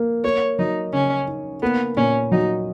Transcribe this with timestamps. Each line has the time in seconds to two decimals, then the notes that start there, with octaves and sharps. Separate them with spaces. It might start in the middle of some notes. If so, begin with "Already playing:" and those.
Already playing: A#3
0.24 A#3 C#5
0.59 F#3 D#4
0.93 C#3 C#4
1.28 D#4
1.62 A#3 B3
1.97 A#2 C#4
2.32 F#3 D#4